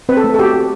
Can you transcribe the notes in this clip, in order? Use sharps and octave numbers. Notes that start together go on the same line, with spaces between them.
C4 B4
A4
A3
A4
F#4 G4
F#4